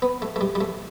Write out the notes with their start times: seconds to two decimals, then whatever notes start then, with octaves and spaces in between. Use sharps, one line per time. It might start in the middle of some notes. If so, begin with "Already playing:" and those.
0.02 B3
0.22 A3
0.36 A3
0.41 G3
0.55 G3
0.61 A3